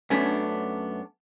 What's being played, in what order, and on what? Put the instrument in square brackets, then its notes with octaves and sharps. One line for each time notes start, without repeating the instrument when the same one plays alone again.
[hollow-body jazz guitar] F#2 A3 B3 [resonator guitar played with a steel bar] C#4 D4